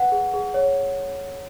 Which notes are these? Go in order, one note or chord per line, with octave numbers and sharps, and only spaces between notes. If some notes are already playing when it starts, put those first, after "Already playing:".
Already playing: B4 F#5
G#4
G#4
C#5